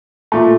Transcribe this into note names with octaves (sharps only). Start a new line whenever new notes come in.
A#2 A3